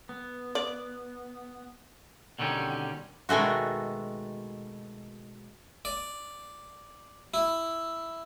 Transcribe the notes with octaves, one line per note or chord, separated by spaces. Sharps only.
B3
D5
B2 D3 D#3 G3 C#4
B2 D#3 G#3 A3 F#4
D5
E4